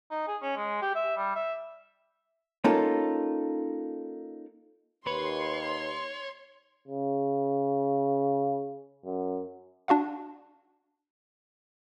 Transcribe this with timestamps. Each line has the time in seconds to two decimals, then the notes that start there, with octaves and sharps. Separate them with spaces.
0.11 D#4
0.27 G#4
0.42 C#4
0.56 G#3
0.82 G4
0.95 E5
1.17 G3
1.36 E5
2.64 A#3 C#4 D#4 F4 A4
5.07 D#2 B4 C#5 C6
6.88 C#3
9.05 F#2
9.88 D4 F#4 F5 F#5